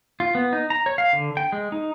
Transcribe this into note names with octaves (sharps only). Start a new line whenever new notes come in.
F4
B3
D#4
A#5
C#5
F5
D3
G5
G#3
D#4